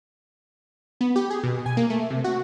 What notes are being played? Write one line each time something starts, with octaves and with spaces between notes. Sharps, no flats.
B3
G4
G#4
B2
G#5
A#3
A3
C3
F#4